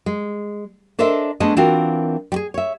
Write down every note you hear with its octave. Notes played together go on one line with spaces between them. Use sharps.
G#3
D4 A4 A#4 C5 D#5 E5
G#3 A3 B3 D4 G#4 D#5
E3 C4 D4 F4 F#4 A#4
G3 G#4
C#5 E5